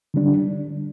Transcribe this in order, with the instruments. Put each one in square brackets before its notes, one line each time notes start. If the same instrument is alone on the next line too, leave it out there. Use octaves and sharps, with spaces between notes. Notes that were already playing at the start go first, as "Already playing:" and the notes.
[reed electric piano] D3 G3 D4